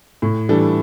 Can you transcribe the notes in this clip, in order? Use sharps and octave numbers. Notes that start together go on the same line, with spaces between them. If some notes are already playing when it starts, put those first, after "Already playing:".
A2
E3 G3 D4 A4